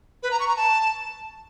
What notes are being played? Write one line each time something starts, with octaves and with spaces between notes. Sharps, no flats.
B4
A#5
C#6
A#5
A5